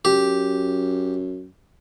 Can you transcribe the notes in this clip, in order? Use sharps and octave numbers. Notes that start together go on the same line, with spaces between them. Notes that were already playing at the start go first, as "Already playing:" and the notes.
F#2 G4